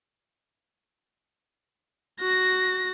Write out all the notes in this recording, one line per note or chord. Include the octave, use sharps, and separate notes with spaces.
F#4 A#6